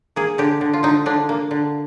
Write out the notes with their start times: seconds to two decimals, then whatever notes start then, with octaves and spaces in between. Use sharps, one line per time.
0.16 A#3 G#4
0.38 D3 G4
0.61 D3
0.73 F4
0.83 D3 D#4
1.06 D3 D4
1.29 A#3
1.51 D3